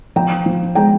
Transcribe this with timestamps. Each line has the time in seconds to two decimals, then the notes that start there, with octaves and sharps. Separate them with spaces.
0.16 F3 G5 A#5
0.46 F3
0.75 G#3 G5 A#5